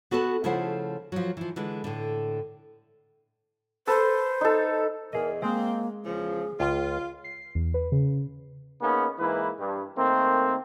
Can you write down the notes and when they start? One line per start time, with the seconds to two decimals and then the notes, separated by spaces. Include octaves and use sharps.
0.11 B3 F#4 A4 B4 A5
0.44 C#3 F3 A3 E4 C5 F#5
1.12 F3 F#3
1.37 E3 F3
1.56 D3 E3 G#3
1.84 A2 D3
3.87 A4 B4 C5
4.41 D#4 A4
5.13 E2 G#4 A#4 D#5
5.42 G#3 A#3 C4
6.05 E2 C#3 F3 G#4
6.60 C#2 F4
7.24 C7
7.55 E2
7.74 B4
7.92 C#3
8.82 A#3 B3 C#4 D#4 G#4
9.19 G#2 E3 A#3 E4 B4
9.60 G2
9.97 D#3 A3 A#3 C4